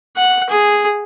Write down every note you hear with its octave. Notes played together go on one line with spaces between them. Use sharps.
F#5
G#4